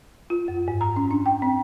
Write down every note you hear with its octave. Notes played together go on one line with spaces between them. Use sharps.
F4
F#2
G#2
A#5
C#4
D4
G5
C4